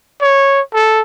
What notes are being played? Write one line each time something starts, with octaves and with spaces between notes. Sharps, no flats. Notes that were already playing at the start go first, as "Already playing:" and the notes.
C#5
A4